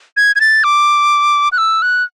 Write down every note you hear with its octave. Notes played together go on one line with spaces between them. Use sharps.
G#6
G#6
A6
D6
F#6
E6
F#6